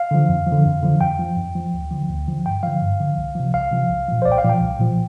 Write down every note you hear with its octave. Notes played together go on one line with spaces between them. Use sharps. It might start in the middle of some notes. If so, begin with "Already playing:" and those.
Already playing: F5
D3 F3
F2
F3
D3
F2
D3 F3
F2 G5
F3
F2
F3
D2
D3 F3
D2
D3 F3
G2 G5
D3 F3 F5
G2
D3 F3
C2
C3 F3
C2 F5
C3 F3
C2
A#2 F3
C5
C2 D5
G5
F5
A#2 F3
G5
C2
A#2 F3